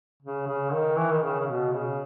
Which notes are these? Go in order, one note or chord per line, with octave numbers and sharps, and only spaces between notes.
C#3
C#3
D#3
E3
D#3
C#3
C#3
B2
C#3